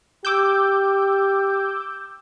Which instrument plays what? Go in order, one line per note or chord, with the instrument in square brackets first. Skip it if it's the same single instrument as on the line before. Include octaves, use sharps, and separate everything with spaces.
[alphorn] G4 [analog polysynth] D6 E6 G6